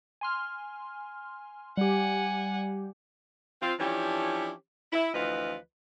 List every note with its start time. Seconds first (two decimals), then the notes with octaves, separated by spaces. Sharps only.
0.21 G#5 C6 F6
1.77 G3 G4 F#5 G#5
3.62 C4 F4
3.80 E3 F3 C#4 D4 G4 C#5
4.93 E4
5.14 D2 E3 F3 F4 B4 D#5